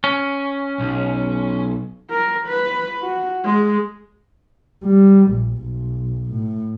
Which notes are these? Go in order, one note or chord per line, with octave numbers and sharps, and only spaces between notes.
C#4
B1
A#4
B4
F#4
G#3
G3
A#1
B1
A2